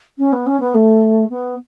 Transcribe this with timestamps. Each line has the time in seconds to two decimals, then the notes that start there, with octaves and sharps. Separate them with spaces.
0.18 C#4
0.32 B3
0.46 C#4
0.60 B3
0.74 A3
1.29 B3